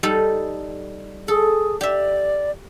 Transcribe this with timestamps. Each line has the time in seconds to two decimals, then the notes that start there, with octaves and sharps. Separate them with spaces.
0.03 G3 D#4 A4
1.28 G#4 A4
1.81 G4 D5 E5